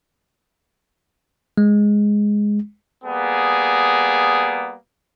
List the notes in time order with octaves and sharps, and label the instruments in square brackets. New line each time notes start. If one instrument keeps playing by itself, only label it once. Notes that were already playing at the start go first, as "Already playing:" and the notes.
[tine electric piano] G#3
[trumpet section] G3 A#3 B3 G#4